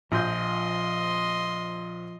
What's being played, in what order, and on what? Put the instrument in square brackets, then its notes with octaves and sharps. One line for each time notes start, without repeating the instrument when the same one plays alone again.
[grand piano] A#1 F4 G6 [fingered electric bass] F3 [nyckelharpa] D#5 C6